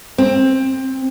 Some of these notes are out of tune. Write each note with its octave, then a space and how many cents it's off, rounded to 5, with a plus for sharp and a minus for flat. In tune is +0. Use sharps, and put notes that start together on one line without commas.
C4 +20